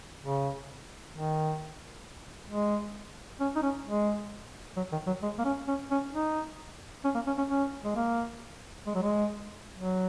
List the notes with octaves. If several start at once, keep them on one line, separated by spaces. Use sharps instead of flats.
C#3
D#3
G#3
C#4
D#4
C#4
G#3
F#3
D#3
F#3
G#3
A#3
C#4
C#4
C#4
D#4
C#4
A#3
C#4
C#4
C#4
G#3
A#3
G#3
F#3
G#3
F#3